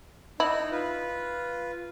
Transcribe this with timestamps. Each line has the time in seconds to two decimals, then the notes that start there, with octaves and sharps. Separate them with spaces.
0.40 D#4 E4
0.71 F4 B4